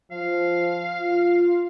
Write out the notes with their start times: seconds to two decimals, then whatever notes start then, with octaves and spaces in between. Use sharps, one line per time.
0.11 F3 F5
1.00 F4